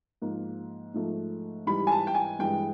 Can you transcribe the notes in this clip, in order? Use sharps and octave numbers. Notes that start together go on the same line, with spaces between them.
G#2 F3 A#3
G#2 F3 A3
G#2 E3 G3 B5
G#5
A5
G5
G#5
G2 E3 G#3 G5